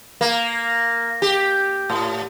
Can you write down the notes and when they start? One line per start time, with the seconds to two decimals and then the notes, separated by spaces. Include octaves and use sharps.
0.21 A#3
1.22 G4
1.90 A2